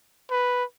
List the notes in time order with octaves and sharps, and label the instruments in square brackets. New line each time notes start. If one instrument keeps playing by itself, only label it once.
[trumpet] B4